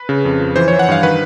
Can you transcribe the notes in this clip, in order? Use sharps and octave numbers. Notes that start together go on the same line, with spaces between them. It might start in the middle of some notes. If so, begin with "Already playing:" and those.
Already playing: B4
C#3
F2
F3
E3 C5
C#5
E3
F#5
G2 F5
D#3 B4